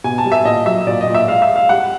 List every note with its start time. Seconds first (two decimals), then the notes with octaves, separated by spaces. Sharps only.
0.04 B2 G#5
0.18 A5
0.25 G3
0.32 E5
0.45 A#2 D#5
0.66 F#3 E5
0.87 A#2 D5
1.01 D#5
1.08 A#2
1.15 E5
1.28 G#3 F5
1.42 E5
1.49 G#3
1.56 F5
1.69 G3 F#5